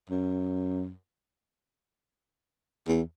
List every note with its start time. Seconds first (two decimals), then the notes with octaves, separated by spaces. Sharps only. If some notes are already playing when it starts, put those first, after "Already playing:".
0.09 F#2
2.88 E2